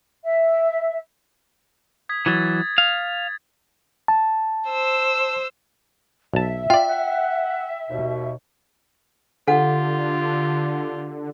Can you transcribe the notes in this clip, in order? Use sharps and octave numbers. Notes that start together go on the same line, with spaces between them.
E5
D#6 G#6 B6
E3 F#3 G#6 A6
F5
A5
C5 E6
B1 E5 A5
F4 D5 G5
F#5
D#2 B2
D3 F4 G4 A4 F#5